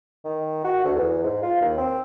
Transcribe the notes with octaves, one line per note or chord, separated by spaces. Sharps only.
D#3
F#4
D2
E2
G#2
F4
D#2
C4